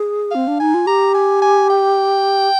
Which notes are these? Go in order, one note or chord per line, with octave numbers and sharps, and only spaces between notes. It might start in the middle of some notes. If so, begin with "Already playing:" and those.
Already playing: G#4
C4 F5
D4
D#4 G#5
F4
G4 A#5
G#5
G#5
G5